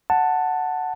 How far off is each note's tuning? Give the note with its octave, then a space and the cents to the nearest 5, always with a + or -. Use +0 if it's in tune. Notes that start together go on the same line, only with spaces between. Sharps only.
F#5 +0 A5 +5